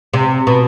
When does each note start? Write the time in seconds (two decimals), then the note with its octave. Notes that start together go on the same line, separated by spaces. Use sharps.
0.13 C3
0.47 B2